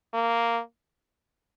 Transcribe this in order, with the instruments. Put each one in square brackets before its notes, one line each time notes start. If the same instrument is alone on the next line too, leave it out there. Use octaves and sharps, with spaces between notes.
[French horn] A#3